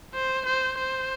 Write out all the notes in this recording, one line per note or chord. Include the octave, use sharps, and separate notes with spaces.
C5
C5
C5